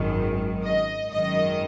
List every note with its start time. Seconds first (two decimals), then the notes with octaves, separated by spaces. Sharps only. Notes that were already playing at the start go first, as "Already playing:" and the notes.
Already playing: G#1 F#2 D#3
0.65 D#5
1.11 G#1 F#2 D#3 D#5